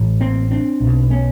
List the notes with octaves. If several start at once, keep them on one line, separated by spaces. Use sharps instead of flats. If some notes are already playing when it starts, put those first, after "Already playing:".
Already playing: A1 A2
A#3 C4
C4 D4
B1 B2
B3 C#4